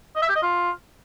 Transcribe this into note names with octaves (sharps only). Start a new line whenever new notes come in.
D#5
E5
G4
D#5
F4